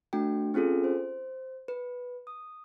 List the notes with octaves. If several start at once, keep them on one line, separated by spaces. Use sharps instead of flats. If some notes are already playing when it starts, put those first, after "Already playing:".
A3 D4 F#4 G5
C4 C#4 F4 G#4 A4
C5
B4
D#6